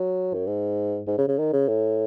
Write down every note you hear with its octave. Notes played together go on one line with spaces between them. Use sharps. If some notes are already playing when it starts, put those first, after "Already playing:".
Already playing: F#3
F#2
G#2
G#2
C#3
C#3
D#3
C#3
A2